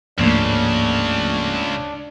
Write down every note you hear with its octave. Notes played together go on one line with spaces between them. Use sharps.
D1 C#2 G#2 C#3 F3 A3 A#3 D4